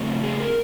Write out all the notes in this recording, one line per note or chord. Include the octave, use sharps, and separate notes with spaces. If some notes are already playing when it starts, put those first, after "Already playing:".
Already playing: C#3 F#3 A3 C4
G#4
A#4